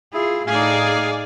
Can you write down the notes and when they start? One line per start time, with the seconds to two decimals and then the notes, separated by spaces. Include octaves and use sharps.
0.13 E4 F4 G#4
0.47 A2 D#4 G#4 D5 F5 G#5